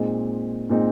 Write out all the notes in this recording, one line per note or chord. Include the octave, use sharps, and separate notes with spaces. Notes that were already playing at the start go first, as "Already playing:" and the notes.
Already playing: A#2 G#3 C4 D#4
A#2 G#3 C4 D#4